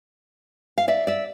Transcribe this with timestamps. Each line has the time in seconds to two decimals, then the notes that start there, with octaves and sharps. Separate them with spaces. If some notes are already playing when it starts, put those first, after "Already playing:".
0.78 F5
0.88 D5 E5
1.07 D5 E5